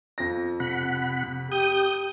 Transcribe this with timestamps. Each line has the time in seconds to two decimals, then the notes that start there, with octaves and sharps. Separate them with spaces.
0.18 F2 F4 A#6
0.60 C3 F#5 B5
1.52 G4 D#6 G6